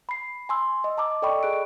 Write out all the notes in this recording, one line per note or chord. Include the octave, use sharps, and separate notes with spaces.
B5 C7
G#5 C6 E6
D#5
A5 A#5 D6 E6
A4 D5 D#5 G5 B5 C#6
G#4 F#6 D7